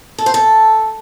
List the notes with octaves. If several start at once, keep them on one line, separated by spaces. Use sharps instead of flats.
A4
C5
A4